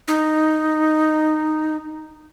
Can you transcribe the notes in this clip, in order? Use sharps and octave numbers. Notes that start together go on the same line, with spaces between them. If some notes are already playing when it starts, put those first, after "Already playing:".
D#4